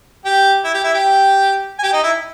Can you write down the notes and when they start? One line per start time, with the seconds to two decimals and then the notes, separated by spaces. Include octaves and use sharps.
0.24 G4 G5
0.64 E4 E5
0.74 G4 G5
0.84 E4 E5
0.94 G4 G5
1.79 G#5
1.83 G4 G5
1.93 D#4 D#5
2.03 E4 E5